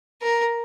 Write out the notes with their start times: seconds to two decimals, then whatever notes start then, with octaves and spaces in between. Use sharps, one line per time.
0.22 A#4